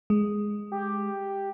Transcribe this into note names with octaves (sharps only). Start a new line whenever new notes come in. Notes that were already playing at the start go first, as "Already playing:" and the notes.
G#3
G4